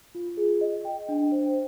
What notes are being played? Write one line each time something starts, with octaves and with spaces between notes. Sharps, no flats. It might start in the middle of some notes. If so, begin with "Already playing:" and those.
F4
G#4
D#5
G5
D4
C5